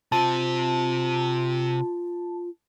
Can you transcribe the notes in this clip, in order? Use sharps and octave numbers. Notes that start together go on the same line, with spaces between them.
C3 C4 F4 A5